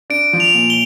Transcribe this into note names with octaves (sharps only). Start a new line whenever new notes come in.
D4 D7
F3
F7
A#2
G7